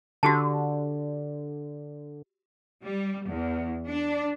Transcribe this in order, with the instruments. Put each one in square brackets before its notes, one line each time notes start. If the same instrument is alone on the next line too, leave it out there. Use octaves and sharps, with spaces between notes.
[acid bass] D3 [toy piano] F#4 G4 A5
[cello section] G3
E2
D4